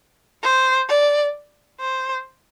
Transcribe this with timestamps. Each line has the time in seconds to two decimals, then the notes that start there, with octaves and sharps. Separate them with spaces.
0.43 C5
0.89 D5
1.80 C5